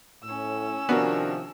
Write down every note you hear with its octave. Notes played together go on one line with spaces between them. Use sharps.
A2 C#4 E6
C3 D#3 F3 B3 D4 F#4 A#4